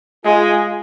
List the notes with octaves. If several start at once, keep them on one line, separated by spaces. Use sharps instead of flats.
G#3 F4 G#4